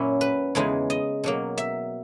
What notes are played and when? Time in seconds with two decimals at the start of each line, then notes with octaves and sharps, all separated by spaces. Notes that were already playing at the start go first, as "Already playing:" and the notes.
Already playing: F#2 A#2 F#3 C#4 E4
0.21 B4
0.55 E2 C#3 E3 G#3 D#4
0.90 D#5
1.24 B2 F#3 A#3
1.58 E5